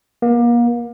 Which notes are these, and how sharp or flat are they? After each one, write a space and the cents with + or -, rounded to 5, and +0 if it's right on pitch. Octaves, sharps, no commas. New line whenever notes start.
A#3 +35